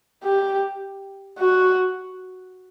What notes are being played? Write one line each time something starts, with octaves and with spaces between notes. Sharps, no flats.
G4
F#4